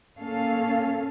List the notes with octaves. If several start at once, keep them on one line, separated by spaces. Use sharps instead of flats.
A#3 C#4 A4 F5